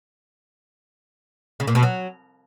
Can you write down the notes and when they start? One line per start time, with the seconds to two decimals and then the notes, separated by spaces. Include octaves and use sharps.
1.60 C#3
1.67 A#2
1.75 B2
1.83 F#3